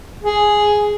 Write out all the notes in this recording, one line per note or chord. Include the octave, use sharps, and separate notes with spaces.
G#4